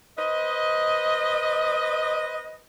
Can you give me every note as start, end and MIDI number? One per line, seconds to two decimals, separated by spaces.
0.18 2.60 71
0.18 2.60 72
0.18 2.60 75